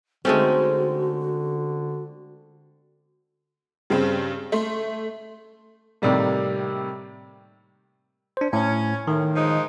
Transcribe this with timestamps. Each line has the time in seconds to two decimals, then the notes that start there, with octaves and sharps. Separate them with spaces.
0.25 D3 G#3 A3 C4 C#4 D#4 F#4
3.90 G2 C#3 C4
4.52 A3 C6
6.02 A2 C3 D#3 G3 A#3
8.37 D4 C5
8.53 A2 C#4
9.07 A2 D#3
9.35 F3 G#3 D#4